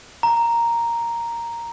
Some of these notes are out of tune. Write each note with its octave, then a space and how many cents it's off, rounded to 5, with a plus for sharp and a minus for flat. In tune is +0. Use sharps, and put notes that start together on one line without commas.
A#5 +0